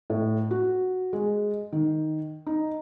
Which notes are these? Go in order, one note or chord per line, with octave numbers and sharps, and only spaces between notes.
A2
F#4
G#3
D#3
D#4